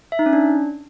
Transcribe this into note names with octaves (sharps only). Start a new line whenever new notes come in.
E5
D#4
C#4
D4